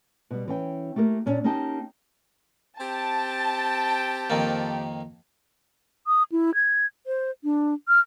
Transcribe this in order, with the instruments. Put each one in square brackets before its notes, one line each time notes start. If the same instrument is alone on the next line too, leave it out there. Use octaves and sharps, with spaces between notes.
[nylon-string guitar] B2 G3
E3 C#4 G5
A3 A#3 G4 A#4
A#2 C#4 D4
A#3 C#4 D#4 G4 G5 A5
[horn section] C4 G4 G5 [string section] A5
[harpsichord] F2 D#3 A#3
[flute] D#6
E4
G#6
C5
D4
F6